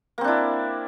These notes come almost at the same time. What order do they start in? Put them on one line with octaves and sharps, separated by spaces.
A#3 C4 D4 E4